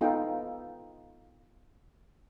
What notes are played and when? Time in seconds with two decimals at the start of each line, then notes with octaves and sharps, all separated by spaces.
0.01 B3 D#4 F4 A4 G5